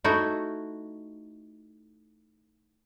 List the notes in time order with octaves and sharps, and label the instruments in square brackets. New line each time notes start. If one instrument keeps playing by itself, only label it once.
[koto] A3 D#4 E4 F#4